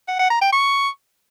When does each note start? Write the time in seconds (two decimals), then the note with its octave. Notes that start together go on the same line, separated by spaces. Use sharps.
0.08 F#5
0.19 F#5
0.30 A#5
0.42 G5
0.53 C#6